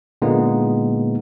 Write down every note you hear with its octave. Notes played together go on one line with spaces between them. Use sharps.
A#2 D3 G#3 A#3 B3 D#4